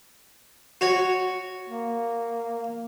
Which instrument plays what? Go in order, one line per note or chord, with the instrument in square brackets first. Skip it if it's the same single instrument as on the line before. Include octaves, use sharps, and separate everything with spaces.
[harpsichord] F#4 C#5
[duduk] A#3